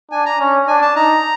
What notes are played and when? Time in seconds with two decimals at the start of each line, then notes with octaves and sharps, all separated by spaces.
0.12 D4 G#5
0.26 A#5
0.39 C#4
0.68 D4 G#5
0.82 A5
0.96 D#4 A#5